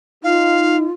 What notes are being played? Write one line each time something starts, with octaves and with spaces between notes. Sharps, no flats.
D#4 F4 F5